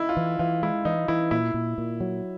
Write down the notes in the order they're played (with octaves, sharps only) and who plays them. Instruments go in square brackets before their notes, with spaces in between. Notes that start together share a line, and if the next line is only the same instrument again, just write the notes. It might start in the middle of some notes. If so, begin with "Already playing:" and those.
Already playing: [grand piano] D#4 E4
F4
[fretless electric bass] E3
[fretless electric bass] E3 [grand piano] F4
[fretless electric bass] G#3 [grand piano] E4
[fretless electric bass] E3 [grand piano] D#4
[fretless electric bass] E3 [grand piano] E4
[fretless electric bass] A#2 [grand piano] E4
[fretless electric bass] A#2
A#2
F#3